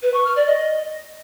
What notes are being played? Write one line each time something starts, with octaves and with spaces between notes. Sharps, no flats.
B4
C#6
F6
D5
D#5